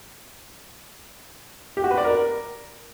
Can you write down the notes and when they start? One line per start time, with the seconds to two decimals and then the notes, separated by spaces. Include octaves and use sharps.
1.77 G4
1.84 F#4
1.91 B4
1.98 D5
2.05 A#4